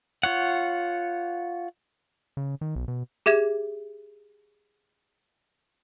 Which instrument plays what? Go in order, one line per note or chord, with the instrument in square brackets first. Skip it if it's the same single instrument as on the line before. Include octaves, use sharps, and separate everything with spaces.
[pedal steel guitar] F4 C#5 F#5
[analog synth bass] C#3
D#3
B1
B2
[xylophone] G4 G#4 E5 G#6 E7